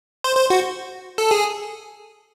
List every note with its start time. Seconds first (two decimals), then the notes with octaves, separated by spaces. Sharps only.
0.24 C5
0.36 C5
0.50 F#4
1.18 A4
1.31 G#4